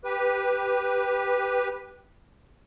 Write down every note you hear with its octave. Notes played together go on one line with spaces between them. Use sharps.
G4 B4